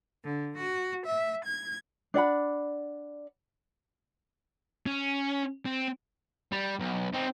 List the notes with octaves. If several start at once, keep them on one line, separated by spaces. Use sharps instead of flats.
D3
F#4
E5
G#6
D4 D5 F#5 B5
C#4
C4
G3
B1
C4 D#4